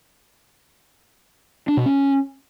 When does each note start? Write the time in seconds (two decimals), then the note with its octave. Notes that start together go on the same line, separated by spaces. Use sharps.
1.68 D4
1.77 B2
1.86 C#4